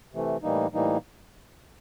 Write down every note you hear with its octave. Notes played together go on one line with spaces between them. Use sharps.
C3 E3 A3
A2 E3 G3 A#3 D#4
A2 E3 G3 A#3 D#4